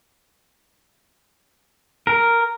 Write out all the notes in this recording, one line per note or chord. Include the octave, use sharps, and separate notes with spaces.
A#4